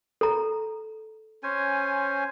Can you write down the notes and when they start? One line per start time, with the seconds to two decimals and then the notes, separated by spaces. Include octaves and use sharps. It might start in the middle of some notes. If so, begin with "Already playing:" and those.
0.21 A4 A#5
1.43 C#4 C5 G#5